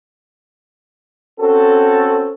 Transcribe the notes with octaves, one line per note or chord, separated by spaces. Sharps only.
C4 C#4 F#4 A4